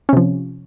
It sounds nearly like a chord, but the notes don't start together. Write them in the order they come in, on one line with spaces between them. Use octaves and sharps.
C#4 C3 F3